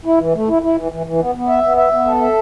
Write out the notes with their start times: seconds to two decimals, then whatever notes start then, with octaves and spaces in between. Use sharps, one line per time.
0.05 E4
0.19 E3
0.35 A3
0.48 E4
0.62 E4
0.77 E3
0.92 E3
1.07 E3
1.20 B3
1.35 B3
1.48 E5
1.64 B3
1.77 E5
1.93 B3
2.07 A4
2.21 E5